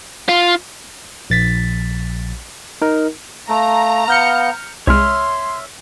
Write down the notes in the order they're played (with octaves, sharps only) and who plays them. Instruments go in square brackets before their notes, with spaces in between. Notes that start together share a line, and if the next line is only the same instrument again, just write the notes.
[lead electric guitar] F4
[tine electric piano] A#1 A6 B6
D#4 A#4
[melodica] A3 [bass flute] F5 [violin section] A#5
[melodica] B3 [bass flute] F5 [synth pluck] F6 G6 C#7
[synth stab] C2 G#3 [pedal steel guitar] C#5 E5 F6 [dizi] C6